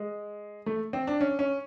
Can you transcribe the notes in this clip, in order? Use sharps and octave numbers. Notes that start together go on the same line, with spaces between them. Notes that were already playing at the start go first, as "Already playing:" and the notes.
Already playing: G#3
A3
C4
D4
C#4
C#4